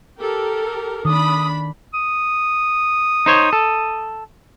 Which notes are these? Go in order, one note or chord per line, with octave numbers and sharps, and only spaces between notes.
G4 A4 A#4
D#3 D4 B5 D#6
D#6
D#4 C5 C#5
A4